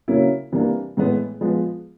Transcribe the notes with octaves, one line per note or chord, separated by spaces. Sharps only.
C#3 F#3 A#3 C#4 E4
C3 E3 G3 A#3 D4
A2 E3 G#3 B3
F3 G#3 B3